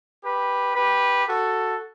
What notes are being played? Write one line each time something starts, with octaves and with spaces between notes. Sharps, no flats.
G4 B4
G4 B4
F#4 A4